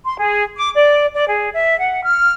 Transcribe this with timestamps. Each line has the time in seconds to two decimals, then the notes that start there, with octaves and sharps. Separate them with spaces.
0.04 C6
0.18 G#4
0.56 D6
0.75 D5
1.15 D5
1.29 G#4
1.53 E5
1.80 F#5
2.05 F6